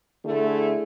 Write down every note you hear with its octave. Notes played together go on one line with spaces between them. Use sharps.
D3 A3 E4 G#4